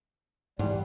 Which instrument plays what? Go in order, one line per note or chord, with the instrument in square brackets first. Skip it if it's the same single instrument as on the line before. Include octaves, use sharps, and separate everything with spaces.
[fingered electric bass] G#2 E3 [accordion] G3